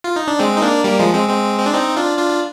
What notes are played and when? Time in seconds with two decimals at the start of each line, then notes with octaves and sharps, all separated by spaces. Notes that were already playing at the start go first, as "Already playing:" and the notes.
0.04 F4
0.16 D#4
0.27 D4
0.39 G#3 C4
0.56 D#4
0.62 A#3 D4
0.84 G3 A#3
0.99 F3 G#3
1.14 G#3 C4
1.28 G#3 C4
1.59 C4
1.66 D4
1.74 C4 D#4
1.96 D4 F4
2.18 D4 F4
2.30 F4